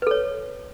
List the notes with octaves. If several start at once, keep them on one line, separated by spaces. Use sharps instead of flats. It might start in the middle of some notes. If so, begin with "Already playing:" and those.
A4 B4 C#5